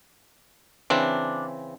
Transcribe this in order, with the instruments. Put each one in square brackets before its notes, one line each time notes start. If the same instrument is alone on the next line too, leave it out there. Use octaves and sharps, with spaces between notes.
[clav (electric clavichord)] C#3 E3 C4 [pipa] D4